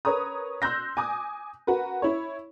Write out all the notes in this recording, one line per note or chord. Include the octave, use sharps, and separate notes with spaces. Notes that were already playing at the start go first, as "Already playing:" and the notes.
A#4 B4 C#5 A#5 D#6
C6 E6 F#6 G6 A#6
G#5 D6 D#6
F#4 A#4 B4
E4 C#5